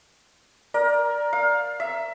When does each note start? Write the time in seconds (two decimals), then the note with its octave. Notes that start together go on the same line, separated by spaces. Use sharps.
0.74 A#4 D5
1.33 F5
1.80 E5